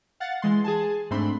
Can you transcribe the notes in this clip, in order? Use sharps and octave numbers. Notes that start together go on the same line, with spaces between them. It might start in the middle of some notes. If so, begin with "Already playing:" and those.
F5 F#5 A6
E3 G#3 C6
G#4 G#5 A5
G#2 A3 C4 D4 B5 C6